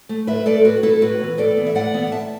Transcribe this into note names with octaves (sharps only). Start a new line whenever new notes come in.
A3
A2 B4 E5
A3 A4 D5
A2 F#4 B4
A3 E4 A4
A2 F#4 B4
E3 B3
A2 A4 D5
E3 B3
E5
A2 D5 F#5
E3 B3
F#5
A2 E5 A5